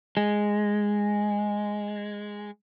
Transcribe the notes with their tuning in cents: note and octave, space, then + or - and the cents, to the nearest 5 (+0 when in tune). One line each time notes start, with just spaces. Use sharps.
G#3 -5